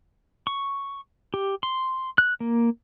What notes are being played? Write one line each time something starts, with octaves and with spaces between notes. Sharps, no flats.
C#6
G4
C6
F#6
A#3